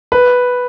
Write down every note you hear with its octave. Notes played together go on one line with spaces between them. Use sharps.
B4